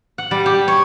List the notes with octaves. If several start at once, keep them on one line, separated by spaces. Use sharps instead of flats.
F#5
G3
G4
C#5